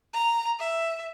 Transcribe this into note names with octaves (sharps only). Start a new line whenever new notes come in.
A#5
E5